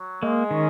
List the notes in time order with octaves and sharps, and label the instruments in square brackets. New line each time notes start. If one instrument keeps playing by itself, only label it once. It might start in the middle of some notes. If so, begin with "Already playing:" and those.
Already playing: [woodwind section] F#3
[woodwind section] G#3 [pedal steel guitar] A#3
[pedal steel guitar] D#3 [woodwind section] C#4